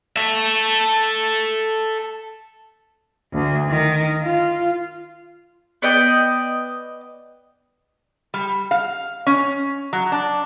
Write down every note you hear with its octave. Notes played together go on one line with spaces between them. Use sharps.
A4 E5
D2
D#3
F4
B3 D5 D#5 G5
G3
F5
C#4
F#3
D4